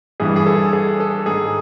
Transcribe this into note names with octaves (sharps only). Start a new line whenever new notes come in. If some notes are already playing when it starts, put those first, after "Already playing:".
G2 E3 G#4
G#4
A4
G#4
A4
G#2 D#3 G#4